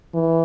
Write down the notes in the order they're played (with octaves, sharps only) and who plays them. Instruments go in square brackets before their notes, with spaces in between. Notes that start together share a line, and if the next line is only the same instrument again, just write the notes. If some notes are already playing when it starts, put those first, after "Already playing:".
[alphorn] E3